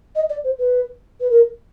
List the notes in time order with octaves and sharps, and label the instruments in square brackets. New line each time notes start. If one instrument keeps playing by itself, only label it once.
[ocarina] D#5
D5
C5
B4
B4
A#4